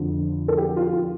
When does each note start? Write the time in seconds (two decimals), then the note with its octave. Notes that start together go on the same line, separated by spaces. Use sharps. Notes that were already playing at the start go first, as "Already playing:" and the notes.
Already playing: F2 D3 F3
0.48 A4
0.58 G4
0.76 F4
0.93 F4